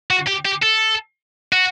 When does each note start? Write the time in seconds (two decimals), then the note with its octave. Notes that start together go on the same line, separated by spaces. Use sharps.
0.10 F#4
0.27 G4
0.45 G4
0.62 A4
1.53 F#4